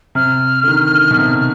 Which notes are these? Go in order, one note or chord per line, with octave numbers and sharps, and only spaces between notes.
C3 F6
D3
D#3
D3
B2
C3